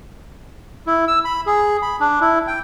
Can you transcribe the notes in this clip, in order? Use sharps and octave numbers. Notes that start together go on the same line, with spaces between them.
E4
E6
B5
G#4
B5
D4
E4
G5